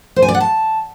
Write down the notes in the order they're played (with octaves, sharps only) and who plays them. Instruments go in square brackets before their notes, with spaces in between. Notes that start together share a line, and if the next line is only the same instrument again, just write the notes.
[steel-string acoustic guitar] C5
G#5
D5
F#5
A5